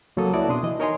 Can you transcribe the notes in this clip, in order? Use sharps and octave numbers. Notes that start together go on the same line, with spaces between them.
C#2 F#3 A#3 A4 D#6
E4 F#4 B4 D5 A5
B2 D4 C6 D#6
E3 D#5
D#4 A#4 C#5 D#5 G#5 C6